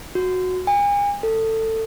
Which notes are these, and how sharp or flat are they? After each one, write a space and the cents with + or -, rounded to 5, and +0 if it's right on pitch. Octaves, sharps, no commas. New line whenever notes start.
F#4 -10
G#5 -40
A4 +20